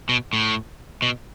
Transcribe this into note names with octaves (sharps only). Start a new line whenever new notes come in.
B2
A2
B2